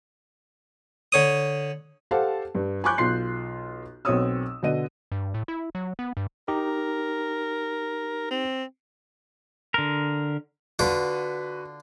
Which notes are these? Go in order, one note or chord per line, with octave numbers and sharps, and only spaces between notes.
D3 C#5 D#6
G4 A4 C5 F5 F#5 A5
G2
G#5 B5 C#6 D6 F#6 G6
B1 F4 C6 C7
B1 C4 F#4 C#5 D#6 E6
B2 D3 D#5 D#7
G2
A2
E4
F#3
B3
G2
D#4 G4 A#4
C4
D3 A#4
D3 F4 F#4 B4 D6